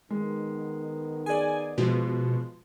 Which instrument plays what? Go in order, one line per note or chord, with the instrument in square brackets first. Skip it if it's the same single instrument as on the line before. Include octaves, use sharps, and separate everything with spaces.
[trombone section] D#3 B3 [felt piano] G#3
[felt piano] G#4 D5 [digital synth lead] G#5
[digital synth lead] B2 [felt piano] F3 G#3